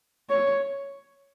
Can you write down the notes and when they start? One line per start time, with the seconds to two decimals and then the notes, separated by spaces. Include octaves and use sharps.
0.29 C#5